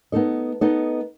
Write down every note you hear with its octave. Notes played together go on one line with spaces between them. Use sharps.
B3 D#4 A4 D#5
B3 D#4 A4 D#5